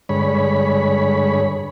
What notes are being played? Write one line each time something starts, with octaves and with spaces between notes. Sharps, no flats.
G2 D3 G#3 C#5 B5